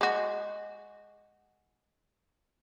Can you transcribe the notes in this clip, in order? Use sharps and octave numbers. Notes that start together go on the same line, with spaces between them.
G#3 F#4